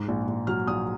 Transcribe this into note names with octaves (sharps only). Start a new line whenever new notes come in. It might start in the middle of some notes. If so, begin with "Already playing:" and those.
Already playing: G#2
A#1
A#1
F#3 F6
A#1 D#6